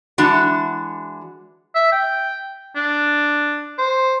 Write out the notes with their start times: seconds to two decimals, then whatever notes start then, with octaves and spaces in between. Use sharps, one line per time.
0.18 E3 G#3 D4 F#4 F#5
1.75 E5
1.92 G5
2.76 D4
3.78 C5